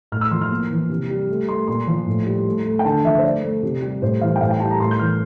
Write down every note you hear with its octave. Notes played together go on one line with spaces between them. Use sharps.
A2 F6
E6
F3 C6
F6
A#3
E3
C3
G3
A3
A3 C6
A#2 C6
F3
A2
G3
A3
A3
G5
D3 A5
F3 E5
C5
A3 D5
A3
C3
G3
A2 C5
E3 F5
G5
A2 F5
G5
G3 A5
A#5
A2 C6
G6
E3 F6